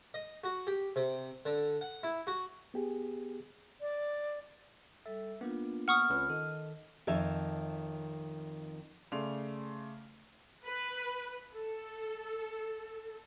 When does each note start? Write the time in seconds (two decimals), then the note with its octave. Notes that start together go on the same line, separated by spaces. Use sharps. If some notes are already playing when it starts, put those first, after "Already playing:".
0.14 D#5
0.44 F#4
0.67 G4
0.96 C3
1.46 D3
1.81 F#5
2.03 E4
2.27 F#4
2.74 B3 G4 G#4
3.81 D5
5.06 G3 A4 E5
5.41 A#3 B3 D4 F4
5.88 F#5 C#6 D#6 F6
6.10 C#2 C4 C#4 F4 B4
6.30 D#3 A4 D#5
7.07 F2 D#3 C#5 E5 A5
9.12 C#3 A3 D5 C6 F7
10.64 B4
11.53 A4